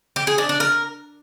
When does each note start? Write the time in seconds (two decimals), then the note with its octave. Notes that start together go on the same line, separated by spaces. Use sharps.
0.16 G4
0.27 G#4
0.38 D4
0.49 D4
0.60 A#4